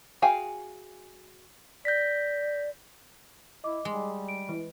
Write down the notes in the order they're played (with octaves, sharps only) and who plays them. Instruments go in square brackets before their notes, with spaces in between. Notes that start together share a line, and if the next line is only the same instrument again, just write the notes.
[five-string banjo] F#4 G#4 F5 G5 G#5
[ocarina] D5 [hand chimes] G6 A#6 B6
[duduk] E4 [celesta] D#5 D6
[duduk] G3 [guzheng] G#3
[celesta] D7
[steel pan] E3